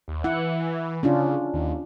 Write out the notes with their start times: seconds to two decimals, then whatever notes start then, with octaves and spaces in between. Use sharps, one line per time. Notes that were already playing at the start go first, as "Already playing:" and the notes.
0.08 D#2
0.24 E3 E4 F#5
1.03 C#3 C#4 D4 F4
1.54 D#2